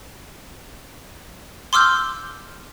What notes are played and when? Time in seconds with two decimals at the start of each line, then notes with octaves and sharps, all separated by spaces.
1.73 C6 D6 E6 F6 G6